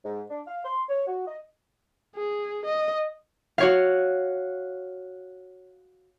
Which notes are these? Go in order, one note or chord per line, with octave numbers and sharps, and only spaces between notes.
G#2
D4
F5
C6
C#5
F#4
D#5
G#4
D#5
F#4 C#5 F5